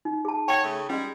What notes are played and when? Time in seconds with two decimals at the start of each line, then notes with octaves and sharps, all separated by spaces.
0.05 D#4
0.25 G#4 A5
0.48 F#4 C#5 G5
0.63 C#3 A3
0.90 G3 G#3 C#4